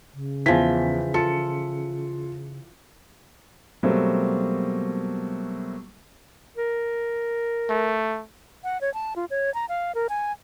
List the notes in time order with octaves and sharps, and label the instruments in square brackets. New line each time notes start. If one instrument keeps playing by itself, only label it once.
[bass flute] C#3
[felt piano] E2 B6 [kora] E3 F3
[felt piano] F4 C#7 [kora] A4
[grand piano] B2 F#3 G3 A3 A#3 C4
[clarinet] A#4
[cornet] A3
[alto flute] F#5
C#5
A5
F4
C#5
A#5
F5
A#4
G#5